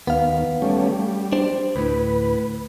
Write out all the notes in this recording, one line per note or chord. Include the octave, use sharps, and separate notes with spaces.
D#2 B3 F5
G3 A3 C#4
G3
D4 C5
D2 A2 B4